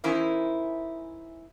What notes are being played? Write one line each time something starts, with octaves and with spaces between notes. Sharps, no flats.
E3 C#4 D#4 E4 A#4 C5